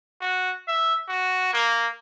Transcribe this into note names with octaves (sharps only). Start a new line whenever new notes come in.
F#4
E5
F#4
A#3